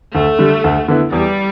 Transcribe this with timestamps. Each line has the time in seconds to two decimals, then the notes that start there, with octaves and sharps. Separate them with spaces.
0.15 D2 A3
0.39 D3 G3
0.64 D2
0.88 D3 B3 E4
1.12 E2 G3